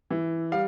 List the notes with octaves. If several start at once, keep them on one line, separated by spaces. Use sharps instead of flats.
E3
G3 F5